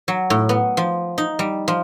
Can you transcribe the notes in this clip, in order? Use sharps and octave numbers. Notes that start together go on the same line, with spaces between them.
F#3
A2
B3
F3
D#4
G3
F3